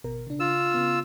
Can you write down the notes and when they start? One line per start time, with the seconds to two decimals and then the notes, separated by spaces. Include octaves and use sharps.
0.04 G#1 B2 A#4
0.27 C#3 D4
0.40 F4 E6
0.74 C#3 B3